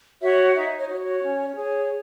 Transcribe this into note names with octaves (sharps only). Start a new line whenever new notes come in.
F#4 C#5 E5
D#4 E5
C#5
F#4 C#5
C#5
C#4
G#4 C#5